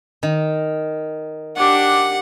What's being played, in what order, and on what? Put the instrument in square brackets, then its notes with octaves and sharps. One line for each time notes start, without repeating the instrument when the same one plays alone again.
[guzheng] D#3
[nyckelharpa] D4 G4 [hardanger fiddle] F#5